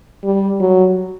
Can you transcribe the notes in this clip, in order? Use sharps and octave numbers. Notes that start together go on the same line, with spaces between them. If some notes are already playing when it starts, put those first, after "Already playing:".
G3
F#3